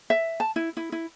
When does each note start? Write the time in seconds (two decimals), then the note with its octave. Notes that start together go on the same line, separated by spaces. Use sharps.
0.10 E5
0.40 A5
0.56 E4
0.77 E4
0.92 E4